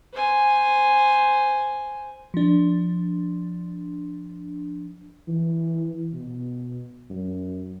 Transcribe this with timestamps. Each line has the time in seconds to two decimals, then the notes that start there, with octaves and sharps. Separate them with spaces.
0.13 C5 G#5
2.34 F3 D4
5.28 E3
6.14 B2
7.10 F#2